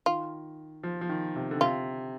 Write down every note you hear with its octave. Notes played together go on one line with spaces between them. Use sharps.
D#3 F4
F3
F3
D#3
C3
D3
C3 F4